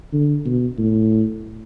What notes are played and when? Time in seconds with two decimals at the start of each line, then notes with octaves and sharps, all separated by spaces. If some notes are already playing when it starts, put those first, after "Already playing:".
0.13 D3
0.45 B2
0.78 A2